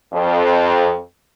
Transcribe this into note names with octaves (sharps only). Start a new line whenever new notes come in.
F2